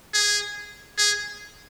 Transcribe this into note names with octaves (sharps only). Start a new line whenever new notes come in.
G#4
G#4